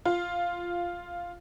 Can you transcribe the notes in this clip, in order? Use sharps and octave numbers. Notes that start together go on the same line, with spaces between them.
F4